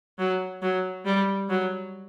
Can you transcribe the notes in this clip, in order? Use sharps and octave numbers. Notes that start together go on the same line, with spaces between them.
F#3
F#3
G3
F#3